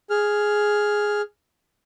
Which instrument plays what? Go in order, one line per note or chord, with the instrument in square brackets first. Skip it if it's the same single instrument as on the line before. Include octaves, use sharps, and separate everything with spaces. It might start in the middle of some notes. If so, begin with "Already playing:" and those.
[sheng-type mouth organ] G#4 F6